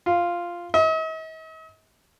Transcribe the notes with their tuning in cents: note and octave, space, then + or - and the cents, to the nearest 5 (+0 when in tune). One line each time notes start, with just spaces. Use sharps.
F4 -5
D#5 +45